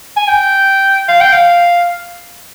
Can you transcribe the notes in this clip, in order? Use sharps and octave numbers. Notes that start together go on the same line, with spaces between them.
G#5
G5
F5
G5
F5